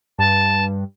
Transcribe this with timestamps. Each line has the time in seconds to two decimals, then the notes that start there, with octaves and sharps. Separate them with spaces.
0.18 G2 A5